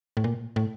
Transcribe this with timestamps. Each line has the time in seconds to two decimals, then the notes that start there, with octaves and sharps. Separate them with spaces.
0.17 A2
0.24 A#2
0.56 A2